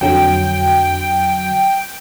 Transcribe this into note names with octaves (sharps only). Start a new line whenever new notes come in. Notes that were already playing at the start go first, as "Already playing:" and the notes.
F2 D3 F#3 G5